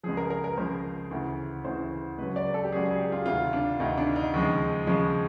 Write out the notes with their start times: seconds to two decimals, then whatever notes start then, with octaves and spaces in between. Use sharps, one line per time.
0.03 C#2 C#3 F3 G#4
0.17 A#4
0.30 A#4
0.44 A#4
0.57 C#2 C#3 F3 C5
1.11 D2 C#3 E3
1.65 D2 C#3 E3 C5
2.18 C#2 C#3 F#3 B4
2.36 D5
2.54 A4
2.64 G4
2.72 C#2 C#3 F#3 G#4
2.86 G#4
2.99 G4
3.12 F4
3.26 D2 C3 D#3 F4
3.53 D4
3.80 D2 C3 D#3 D#4
3.98 D4
4.16 D#4
4.34 D#2 C#3 F3 G#3
4.87 D#2 C#3 F3 G#3